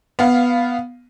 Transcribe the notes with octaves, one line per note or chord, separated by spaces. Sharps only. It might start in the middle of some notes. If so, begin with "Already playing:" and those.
B3 F5